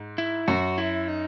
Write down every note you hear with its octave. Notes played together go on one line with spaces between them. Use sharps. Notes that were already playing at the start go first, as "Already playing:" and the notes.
Already playing: G#2
E4
F#2 F#4
E4
D#4